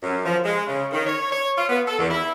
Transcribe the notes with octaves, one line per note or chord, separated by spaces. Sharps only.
F#2
F3
G#3
C#3
D#3
C#5
C#5
F4
B3
A4
E2
E4